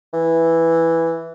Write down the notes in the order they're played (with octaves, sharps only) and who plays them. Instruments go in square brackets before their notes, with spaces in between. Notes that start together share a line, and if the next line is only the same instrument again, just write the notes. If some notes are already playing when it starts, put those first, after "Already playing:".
[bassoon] E3